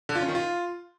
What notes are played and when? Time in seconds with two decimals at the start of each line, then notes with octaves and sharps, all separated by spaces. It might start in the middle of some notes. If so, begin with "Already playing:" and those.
0.09 D3
0.16 F4
0.22 C#4
0.28 D#3
0.35 F4